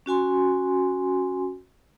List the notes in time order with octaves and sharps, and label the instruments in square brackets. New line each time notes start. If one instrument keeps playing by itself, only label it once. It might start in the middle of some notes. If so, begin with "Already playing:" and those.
[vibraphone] C#4 F#4 G#5 C6